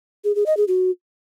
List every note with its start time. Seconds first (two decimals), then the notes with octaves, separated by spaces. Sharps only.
0.24 G#4
0.35 G#4
0.46 D#5
0.57 G#4
0.68 F#4